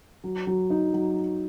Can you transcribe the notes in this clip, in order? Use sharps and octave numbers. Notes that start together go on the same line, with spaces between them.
F#3
F#3
D#4
F#3